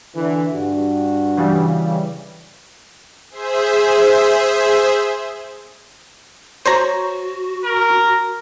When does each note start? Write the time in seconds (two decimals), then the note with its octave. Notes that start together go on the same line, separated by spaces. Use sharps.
0.16 D3 E3
0.53 G2 F#4
1.37 C#3 E3 G3
3.30 G#4 C5 E5
6.66 F#4 C5 C#5 A#5
7.65 A#4